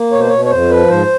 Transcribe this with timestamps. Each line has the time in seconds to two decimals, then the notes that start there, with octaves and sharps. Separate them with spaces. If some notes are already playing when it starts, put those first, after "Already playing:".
Already playing: A#3
0.12 B2 C#5
0.21 C5
0.28 B2 C#5
0.45 C#5
0.51 F2 C5
0.70 F3 B4
0.89 G#2 C5